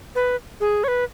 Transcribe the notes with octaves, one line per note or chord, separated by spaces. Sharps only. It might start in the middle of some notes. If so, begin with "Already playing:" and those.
B4
G#4
C#5
B4